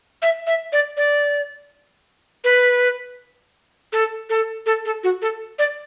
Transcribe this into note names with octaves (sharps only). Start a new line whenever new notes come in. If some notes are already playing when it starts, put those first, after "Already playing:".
E5
E5
D5
D5
B4
A4
A4
A4
A4
F#4
A4
D5